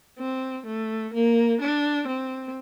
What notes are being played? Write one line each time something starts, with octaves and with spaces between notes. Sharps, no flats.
C4
A3
A#3
D4
C4